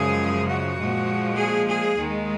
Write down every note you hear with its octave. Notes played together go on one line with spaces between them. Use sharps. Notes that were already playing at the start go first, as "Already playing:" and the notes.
Already playing: F#2 C#3 F3 G#3 G#4
F#4
A#2 F3 G#3
G#4
G#4
D#2 D#3 G#3